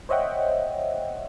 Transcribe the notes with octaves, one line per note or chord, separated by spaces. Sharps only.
C5 C#5 D#5 E5 F#5 G5